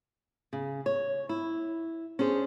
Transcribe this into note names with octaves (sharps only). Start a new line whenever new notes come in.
C#3
C#5
E4
C#4 D4 G#4 C5